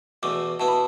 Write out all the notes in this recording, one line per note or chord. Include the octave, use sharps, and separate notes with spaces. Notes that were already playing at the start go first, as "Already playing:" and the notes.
E2 B2 A3 D6
B2 B3 E4 A5
B5